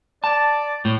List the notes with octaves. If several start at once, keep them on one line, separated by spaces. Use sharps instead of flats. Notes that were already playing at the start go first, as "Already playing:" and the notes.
D5 A5
A2